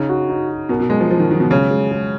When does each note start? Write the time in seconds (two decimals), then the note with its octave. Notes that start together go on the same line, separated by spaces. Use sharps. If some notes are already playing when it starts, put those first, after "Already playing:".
Already playing: C#3 D#4
0.09 F#4
0.29 D#4
0.49 F#4
0.69 B2 A#4
0.80 B2
0.90 F#3 G#3
1.00 F3
1.10 F3 F#3
1.20 D#3
1.30 D#3 F#3
1.40 B2
1.50 C#3 G#3
1.70 G#3
1.91 G#3